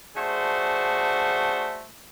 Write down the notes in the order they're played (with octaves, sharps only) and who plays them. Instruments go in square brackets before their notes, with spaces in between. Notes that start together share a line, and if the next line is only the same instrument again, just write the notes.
[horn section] A3 D4 F#4 G#4 C5